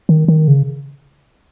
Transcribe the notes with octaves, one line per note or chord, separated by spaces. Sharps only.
D#3
D#3
C#3